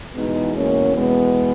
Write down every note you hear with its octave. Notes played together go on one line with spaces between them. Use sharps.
E2 B2 G#3 B3 D#4
A#3 C#4
G#3 B3